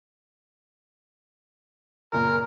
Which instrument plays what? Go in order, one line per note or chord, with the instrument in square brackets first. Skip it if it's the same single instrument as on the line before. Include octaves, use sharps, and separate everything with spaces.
[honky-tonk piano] F#1 A#2 [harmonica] A#4